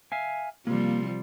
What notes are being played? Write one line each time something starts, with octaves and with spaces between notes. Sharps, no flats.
E5 F5 G#5
C3 F3 G3 A#3